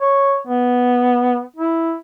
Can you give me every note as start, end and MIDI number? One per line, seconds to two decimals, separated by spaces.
0.01 0.38 73
0.47 1.42 59
1.56 1.95 64